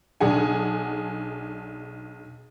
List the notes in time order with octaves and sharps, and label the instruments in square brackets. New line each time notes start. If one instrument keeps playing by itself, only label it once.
[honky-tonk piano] B1 D4 G#4 F#5 G#5